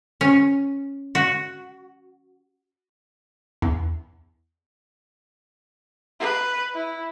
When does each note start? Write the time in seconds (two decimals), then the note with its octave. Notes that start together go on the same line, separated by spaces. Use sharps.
0.21 C#4
1.15 F#4
3.62 E2
6.20 B4
6.74 E4